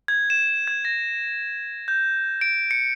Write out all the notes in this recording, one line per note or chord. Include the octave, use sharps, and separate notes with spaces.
G#6
E7
G#6
A#6
G6
D7
C#7